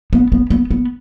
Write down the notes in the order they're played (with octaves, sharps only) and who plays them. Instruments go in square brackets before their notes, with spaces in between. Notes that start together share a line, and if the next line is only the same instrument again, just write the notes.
[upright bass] B3
B3
B3
B3